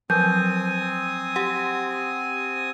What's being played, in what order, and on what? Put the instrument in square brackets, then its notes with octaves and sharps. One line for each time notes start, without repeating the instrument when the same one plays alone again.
[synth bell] F3 F#3 [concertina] C4 G#5 D#6 [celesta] G6
[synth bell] G4 F#5